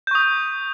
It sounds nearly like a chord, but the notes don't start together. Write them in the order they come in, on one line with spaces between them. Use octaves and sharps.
G6 C#6 D#6